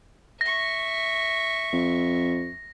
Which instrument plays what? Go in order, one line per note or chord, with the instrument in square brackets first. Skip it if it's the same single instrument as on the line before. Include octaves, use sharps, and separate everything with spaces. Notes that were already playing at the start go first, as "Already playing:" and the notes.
[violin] E5 C#6 [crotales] A#6
[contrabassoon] F2